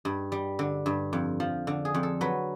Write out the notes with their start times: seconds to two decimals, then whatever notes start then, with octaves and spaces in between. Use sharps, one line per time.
0.05 G2
0.32 G3
0.59 D3
0.86 G2
1.13 F2
1.40 F3
1.67 D3
1.85 G#4
1.94 F2
2.03 A4
2.21 F#3 B4